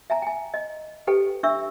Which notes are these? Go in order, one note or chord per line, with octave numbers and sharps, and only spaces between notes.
E5 G#5 A#5
G5 G#5
D#5
G4 A4 B4 G5
D4 E5 C#6 E6